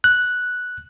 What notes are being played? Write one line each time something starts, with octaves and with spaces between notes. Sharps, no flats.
F#6